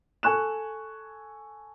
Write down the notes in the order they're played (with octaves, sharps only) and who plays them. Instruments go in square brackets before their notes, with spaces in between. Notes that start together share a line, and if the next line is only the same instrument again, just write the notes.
[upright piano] A4 G#5 C#6 F#6 E7